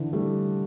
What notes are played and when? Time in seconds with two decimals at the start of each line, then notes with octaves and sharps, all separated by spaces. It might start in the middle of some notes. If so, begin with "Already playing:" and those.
Already playing: D3 E3
0.13 G3 A3